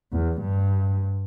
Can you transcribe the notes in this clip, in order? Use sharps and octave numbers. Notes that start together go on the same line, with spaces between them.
E2
G2